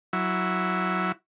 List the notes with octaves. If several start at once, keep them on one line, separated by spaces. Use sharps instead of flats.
F#3 E4